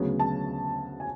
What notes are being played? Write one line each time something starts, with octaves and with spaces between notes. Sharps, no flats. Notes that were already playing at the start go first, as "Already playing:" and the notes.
Already playing: D2 C#3 F#3 B3
A5
G#5